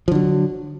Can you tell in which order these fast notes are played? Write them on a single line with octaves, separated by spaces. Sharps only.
F3 D3 F#3